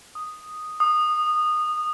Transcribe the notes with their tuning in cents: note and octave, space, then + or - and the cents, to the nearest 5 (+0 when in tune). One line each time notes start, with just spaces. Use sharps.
D#6 -5
D#6 -20